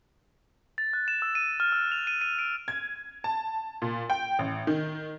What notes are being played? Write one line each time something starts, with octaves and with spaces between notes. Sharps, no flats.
A6
F#6
E7
E6
D#7
F6
E6
F7
D#7
D#7
D7
G#6
A5
A#2
G5
A1
D#3